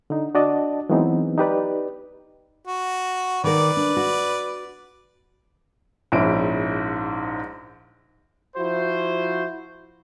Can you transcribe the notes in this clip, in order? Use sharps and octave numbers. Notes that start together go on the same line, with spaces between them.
D3 D#4
D4 F#4 D5 D#5 A5
E3 F#3 G#3 B3 C4 D#4
D#4 G4 B4 D5
F#4
D#3 A#4 B4 D5
D4
F#4
A#1 G#2 C#4 E4 D7
F3 E4 F#4 C5